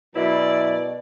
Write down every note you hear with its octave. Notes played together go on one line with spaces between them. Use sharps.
F#2 B2 E4 D5